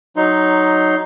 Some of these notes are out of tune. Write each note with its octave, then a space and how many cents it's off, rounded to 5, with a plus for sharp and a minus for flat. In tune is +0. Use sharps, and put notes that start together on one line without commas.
F#3 +0 D#4 +0 C6 +0